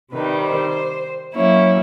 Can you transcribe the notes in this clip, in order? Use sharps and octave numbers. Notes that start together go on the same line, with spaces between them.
C3 D#3 G3 B4
C5
F#3 A#3 C#4 E4 C#5